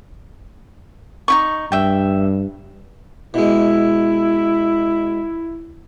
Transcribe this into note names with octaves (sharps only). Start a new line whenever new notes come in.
D#4 E4 C#6
G2 E5 G5
B2 G#3 E4